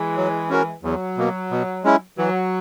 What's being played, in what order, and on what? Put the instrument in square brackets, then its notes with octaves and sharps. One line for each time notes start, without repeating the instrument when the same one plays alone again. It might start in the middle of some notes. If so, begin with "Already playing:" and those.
Already playing: [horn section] E3 G#3
[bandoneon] F#3
C#4 F#4 A#4
[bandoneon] E2 [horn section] F#3
[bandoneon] B2 A#3
B2
G#3 C#4 E4
[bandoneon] E3 [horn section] F#3